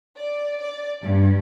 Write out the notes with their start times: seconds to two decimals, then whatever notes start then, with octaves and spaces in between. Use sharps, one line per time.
0.18 D5
0.59 D5
1.03 G2